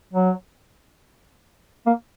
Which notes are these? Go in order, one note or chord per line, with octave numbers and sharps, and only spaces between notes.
F#3
A#3